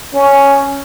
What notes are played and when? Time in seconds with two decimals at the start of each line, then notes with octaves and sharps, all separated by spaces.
0.14 C#4